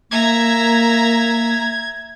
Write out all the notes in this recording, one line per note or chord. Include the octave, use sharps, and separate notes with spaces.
A#3 E5 A#5 G#6